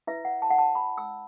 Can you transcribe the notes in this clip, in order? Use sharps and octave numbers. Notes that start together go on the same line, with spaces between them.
E4 B4 E5
F#5
A5
F#5
A5
B5
E6